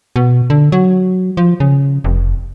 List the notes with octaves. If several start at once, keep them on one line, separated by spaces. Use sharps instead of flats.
B2
D3
F#3
F3
C#3
F1